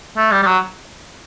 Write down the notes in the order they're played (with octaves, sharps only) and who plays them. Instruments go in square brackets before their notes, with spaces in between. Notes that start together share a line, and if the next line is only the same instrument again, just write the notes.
[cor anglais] A3
G3
G3
F#3